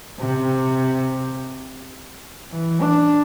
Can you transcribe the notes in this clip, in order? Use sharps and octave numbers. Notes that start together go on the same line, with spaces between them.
C3
E3
D4